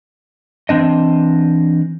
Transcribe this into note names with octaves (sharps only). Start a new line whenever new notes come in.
E3 C4 D4 D#5